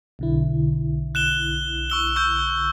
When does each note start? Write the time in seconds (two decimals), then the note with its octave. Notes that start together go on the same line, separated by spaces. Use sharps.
0.19 B1 D3 E4
1.15 F#6 E7 G7
1.90 C#6 E6 G7
2.16 C#6 E6 G6